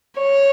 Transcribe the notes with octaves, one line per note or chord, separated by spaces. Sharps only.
C#5